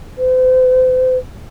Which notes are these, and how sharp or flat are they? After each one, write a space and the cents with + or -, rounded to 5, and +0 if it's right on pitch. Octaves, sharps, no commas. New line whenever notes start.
C5 -40